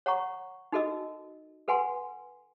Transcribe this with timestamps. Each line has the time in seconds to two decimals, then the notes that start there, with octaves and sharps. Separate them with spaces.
0.06 C#5 F#5 A#5 C#6
0.72 D#4 F#4 A4 A#4 D#5 E6
1.68 A4 B4 F#5 G#5 C6